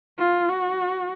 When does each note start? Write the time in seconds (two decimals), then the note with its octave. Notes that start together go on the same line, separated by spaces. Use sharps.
0.19 F4
0.49 F#4